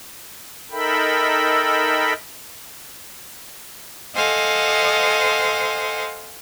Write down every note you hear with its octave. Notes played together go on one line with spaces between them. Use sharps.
D#4 A4 A#4 E5 G5 B5
A4 C5 D#5 F5 F#5 G#5